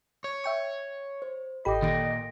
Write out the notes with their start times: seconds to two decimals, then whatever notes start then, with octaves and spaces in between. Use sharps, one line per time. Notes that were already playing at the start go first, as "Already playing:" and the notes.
0.24 C#5
0.44 E5 G5 C#6
1.22 C5
1.65 G#1 G4 A4 D#5 G5 B5 D6
1.82 A#2 D#3 D#6 A#6 D7